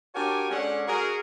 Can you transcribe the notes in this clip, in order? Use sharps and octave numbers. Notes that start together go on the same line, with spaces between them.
D4 F#4 G4 A#4 C#5 G#5
G#3 C#4 D4 A4 C#5 F#5
F#4 G#4 A#4